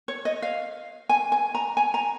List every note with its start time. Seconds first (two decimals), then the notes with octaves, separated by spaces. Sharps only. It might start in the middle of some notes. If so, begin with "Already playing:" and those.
0.08 C#5
0.25 D#5
0.42 F5
1.09 G#5
1.32 G#5
1.55 A#5
1.77 G#5
1.94 A#5